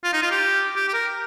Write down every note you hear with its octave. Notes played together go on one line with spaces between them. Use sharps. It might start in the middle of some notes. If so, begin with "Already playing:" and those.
F4
D#4
F4
G4
G4
G4
A#4